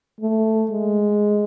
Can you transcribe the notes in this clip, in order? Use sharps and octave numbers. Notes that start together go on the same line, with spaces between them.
A3
G#3